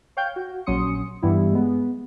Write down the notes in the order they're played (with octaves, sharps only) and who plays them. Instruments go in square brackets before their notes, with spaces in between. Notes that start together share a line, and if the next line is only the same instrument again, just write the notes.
[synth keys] C#5 F5 G5 G6
F#4
A#1 F#3 C#4 C6 D#6 C#7
G2 E3 G3 B3 E4
G#3 B3